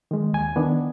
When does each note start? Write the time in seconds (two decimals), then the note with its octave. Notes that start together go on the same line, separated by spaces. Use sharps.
0.11 D#3 G#3
0.33 D#2 G#5
0.56 D#3 B3 D4